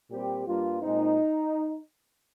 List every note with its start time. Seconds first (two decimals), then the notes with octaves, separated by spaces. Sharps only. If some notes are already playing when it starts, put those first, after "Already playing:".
0.11 A#2 G3 C4 G4
0.47 G2 G3 A#3 F4
0.82 A#2 G#3 C4 D#4